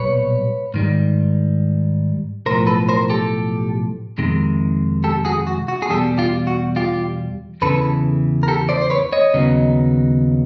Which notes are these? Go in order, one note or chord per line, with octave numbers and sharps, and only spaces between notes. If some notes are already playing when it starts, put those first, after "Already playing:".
Already playing: B1 A#2 G3 B4 C#5
G#2 D#3 G3
B1 A2 F3 A#4 C5
A4 B4
A#4 C5
G4 A4
F2 C3 D#3 G#3
G4 A4
F#4 G#4
F#4
F#4
G#4
E2 B2 G3 G4 A4
F4 G4
F#4
F4 G4
E2 C#3 E3 A4 B4
A#4
G4 A4
C5 D5
C5
B4 C#5
C#5 D#5
D#2 C#3 F#3 B3 D#4